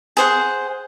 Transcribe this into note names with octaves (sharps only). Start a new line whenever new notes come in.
G#4 C5 F#5